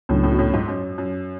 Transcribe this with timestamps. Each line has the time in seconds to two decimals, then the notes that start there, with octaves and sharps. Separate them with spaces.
0.09 C#2 F#2 A2 C#3 F#3 B3 D4
0.23 F#2 A2
0.32 B2
0.38 F#2 A2
0.54 G#2
0.68 F#2
0.98 F#2